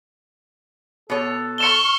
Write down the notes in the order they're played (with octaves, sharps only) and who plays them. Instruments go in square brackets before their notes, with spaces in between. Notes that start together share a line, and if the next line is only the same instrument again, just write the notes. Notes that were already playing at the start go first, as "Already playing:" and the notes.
[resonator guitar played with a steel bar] B2 C#5 [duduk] A4
[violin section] C#6 F6 [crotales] C#7 E7 G7